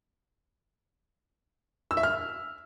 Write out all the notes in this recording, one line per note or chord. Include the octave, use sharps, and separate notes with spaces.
E6
E5
F6